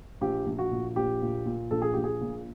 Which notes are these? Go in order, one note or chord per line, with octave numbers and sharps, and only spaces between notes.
A#1 G4
A#1
F#4
A#2
A#1 G4
A#2
A#2
A#1 A4
G#4
A#1 G4
G#4
A#2